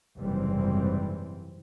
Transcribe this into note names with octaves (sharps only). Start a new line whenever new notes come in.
F#1 G#2 C3 E3 G3 C4